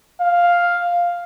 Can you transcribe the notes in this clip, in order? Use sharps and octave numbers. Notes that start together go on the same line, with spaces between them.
F5